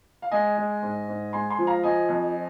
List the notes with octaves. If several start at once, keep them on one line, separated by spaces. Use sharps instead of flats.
F5
G#3 D#5 G#5
G#3
G#2
G#2
G#3 G#5 C6
G#5 C6
F3
F5 A#5
F3 D#5 G#5
F2